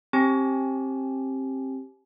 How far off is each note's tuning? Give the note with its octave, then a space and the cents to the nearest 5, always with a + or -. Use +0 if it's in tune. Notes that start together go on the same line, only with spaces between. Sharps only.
C4 +25 G4 +0 G#5 +40